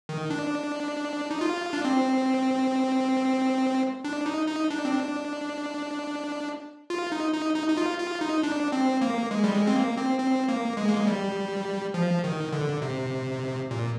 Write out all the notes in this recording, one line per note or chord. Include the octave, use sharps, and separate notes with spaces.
D#3
D4
D#4
F4
D4
C4
D4
D#4
D#4
D4
C4
D4
F4
D#4
D#4
D#4
D#4
F4
F4
D#4
D4
C4
A#3
G#3
G3
G#3
C4
A#3
C4
C4
A#3
G#3
A#3
G#3
G3
F3
D#3
D3
C3
A#2